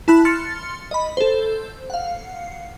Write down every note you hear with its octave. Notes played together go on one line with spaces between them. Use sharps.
E4 A5 B5 F#6
C6 F6 A6 C#7
D#5 B5
A4 C5
F5 F#5